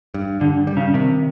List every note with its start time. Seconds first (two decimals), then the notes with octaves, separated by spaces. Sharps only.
0.14 G2
0.41 G2 D3
0.67 G3
0.77 C#3
0.94 C3 D#3